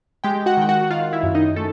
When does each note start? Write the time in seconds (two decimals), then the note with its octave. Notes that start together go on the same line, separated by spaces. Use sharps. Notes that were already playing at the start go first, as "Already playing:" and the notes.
0.24 G#3 G4 G5
0.46 F#4 F#5
0.57 D#3 G5
0.69 F#4 F#5
0.90 D#3 F4 F5
1.13 E4 E5
1.23 F#2
1.35 D#4 D#5
1.56 G#3 A3 A4